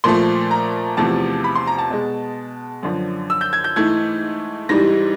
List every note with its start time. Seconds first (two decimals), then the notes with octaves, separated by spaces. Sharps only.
0.04 A#2 F3 A3 C6
0.51 A#5
0.97 E2 C3 F3 A3 A5
1.44 B5
1.55 C6
1.67 A#5
1.79 A5
1.90 B2 G#3
2.83 F#2 D3 F3
3.30 E6
3.41 G6
3.53 G#6
3.64 G6
3.76 G#2 E3 A3 G#6
4.69 G#2 E3 G3 A#6